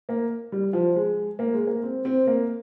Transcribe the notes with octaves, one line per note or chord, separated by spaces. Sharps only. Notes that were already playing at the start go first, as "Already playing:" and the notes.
A#3
G3
F3
G#3
A#3
G#3
A#3
C4
C4
A#3